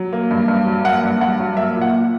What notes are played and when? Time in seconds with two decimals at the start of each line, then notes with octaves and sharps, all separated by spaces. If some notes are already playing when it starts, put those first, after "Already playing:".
Already playing: F#3
0.13 A#3
0.31 G2
0.48 G2
0.66 F#3
0.85 A#3 F#5
1.04 G2
1.21 G2 F#5
1.40 F#3
1.57 A#3 E5
1.76 A#2
1.81 F#5
1.93 A#2